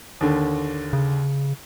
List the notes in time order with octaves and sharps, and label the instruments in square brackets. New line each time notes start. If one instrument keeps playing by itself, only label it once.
[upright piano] D#2 D3
[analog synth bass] C#3